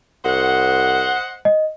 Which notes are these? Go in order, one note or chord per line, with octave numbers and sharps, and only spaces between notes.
C2 C5 D#5 F#5
D#5